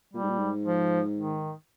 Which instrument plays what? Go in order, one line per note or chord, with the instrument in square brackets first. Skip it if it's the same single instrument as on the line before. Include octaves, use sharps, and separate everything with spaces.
[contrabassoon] A#2 [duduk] G3
[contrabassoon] G#2
A#2
G#2
[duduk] F3
D#3